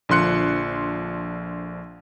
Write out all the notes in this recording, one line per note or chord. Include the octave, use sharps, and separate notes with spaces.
A#1 D3 F3 C6 F#6 C#7